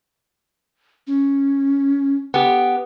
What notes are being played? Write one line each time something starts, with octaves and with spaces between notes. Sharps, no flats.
C#4
B3 G4